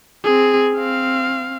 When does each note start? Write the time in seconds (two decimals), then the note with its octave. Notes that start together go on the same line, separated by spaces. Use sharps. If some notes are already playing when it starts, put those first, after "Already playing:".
0.24 C4 G#4
0.74 C4 F5